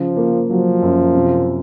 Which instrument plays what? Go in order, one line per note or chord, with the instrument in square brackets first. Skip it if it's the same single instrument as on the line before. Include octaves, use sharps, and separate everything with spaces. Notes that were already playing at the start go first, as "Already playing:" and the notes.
Already playing: [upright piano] C#3 [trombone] F3
[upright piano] A#3
[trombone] F3 [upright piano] F#3
[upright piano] F#2
C3